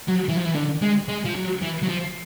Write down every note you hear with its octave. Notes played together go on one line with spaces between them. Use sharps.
F#3
E3
F3
E3
D3
G#3
G#3
F3
F#3
E3
F#3
F3